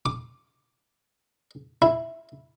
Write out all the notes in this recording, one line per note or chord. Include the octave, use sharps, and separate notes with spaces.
D6
E4